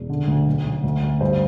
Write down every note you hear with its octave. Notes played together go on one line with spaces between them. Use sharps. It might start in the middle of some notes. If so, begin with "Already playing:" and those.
Already playing: E1
D3
D2
B1
B1
D2
D2
G2 C5